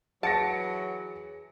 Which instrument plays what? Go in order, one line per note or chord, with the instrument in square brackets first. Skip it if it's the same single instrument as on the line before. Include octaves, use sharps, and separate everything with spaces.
[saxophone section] E3 F#3 [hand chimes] G#4 [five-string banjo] A5 [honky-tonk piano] A#6 C#7 D7